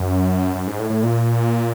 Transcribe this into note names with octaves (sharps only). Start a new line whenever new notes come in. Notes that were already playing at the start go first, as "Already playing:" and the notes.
Already playing: F#2
F#2
G#2
A2
A2
A#2